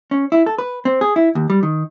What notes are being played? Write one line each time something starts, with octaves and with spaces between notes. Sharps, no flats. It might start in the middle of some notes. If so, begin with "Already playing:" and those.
C#4
E4
A4
B4
C4
G#4
E4
D#2
G3
D#3